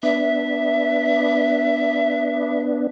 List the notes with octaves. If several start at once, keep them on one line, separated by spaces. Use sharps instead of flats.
B3 D4 E5